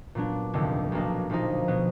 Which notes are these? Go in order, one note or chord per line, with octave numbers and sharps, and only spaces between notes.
A#2 F#3 B3 D4
F1 D#2 D3
B1 B2 A#3 D4
B1 A#2 F3 A#3 D#4
B2 F#3 B3